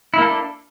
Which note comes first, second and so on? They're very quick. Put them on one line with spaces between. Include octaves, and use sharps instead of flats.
E4 A#3 A4 D4